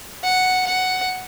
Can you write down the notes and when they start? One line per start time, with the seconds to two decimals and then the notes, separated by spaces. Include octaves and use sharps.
0.24 F#5
0.66 F#5